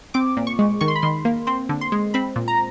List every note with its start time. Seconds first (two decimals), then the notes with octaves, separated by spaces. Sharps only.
0.14 C4 D6
0.37 A#2
0.47 C#6
0.59 G#3
0.81 D#3 C#6
0.88 C6
0.96 B5
1.02 D#3 C6
1.25 A#3
1.47 C4 C6
1.69 D3
1.81 C6
1.92 G#3
2.14 C4 B5
2.36 A#2
2.48 A#5